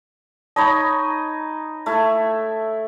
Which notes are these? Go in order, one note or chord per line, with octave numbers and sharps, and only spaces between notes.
D#4 C#5 D#5 A5 B5
A3 E4